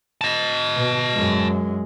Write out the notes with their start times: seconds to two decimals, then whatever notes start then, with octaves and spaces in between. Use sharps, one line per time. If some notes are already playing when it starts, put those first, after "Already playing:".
0.21 D#5 A5
0.75 B2
1.12 F#2 G#3